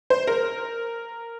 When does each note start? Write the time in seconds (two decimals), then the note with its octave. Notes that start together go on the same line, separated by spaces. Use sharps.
0.10 C5
0.27 A#4